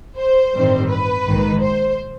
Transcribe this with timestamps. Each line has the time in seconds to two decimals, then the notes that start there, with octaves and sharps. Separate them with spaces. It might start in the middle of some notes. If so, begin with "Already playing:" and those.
0.19 C5
0.55 A1 G2 D#3 G3 C4
0.90 B4
1.26 A#1 G#2 D#3
1.62 C5